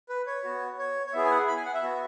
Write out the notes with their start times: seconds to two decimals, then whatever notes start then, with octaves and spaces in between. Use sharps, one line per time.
0.09 B4
0.27 C#5
0.44 B3 F#4
0.79 C#5
1.07 C#5
1.13 B3 E4 G#4 E5
1.25 G#5
1.31 F#5
1.48 B5
1.57 G#5
1.65 F#5
1.74 E5
1.83 B3 F#4